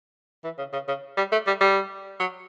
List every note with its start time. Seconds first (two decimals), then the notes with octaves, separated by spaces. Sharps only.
0.44 E3
0.59 C#3
0.73 C#3
0.88 C#3
1.17 G3
1.32 A3
1.47 G3
1.61 G3
2.19 F#3